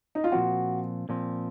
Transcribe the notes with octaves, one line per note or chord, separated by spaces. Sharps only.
D#4
F4
A#2 F3 C4 F#4
A#2 F3 C4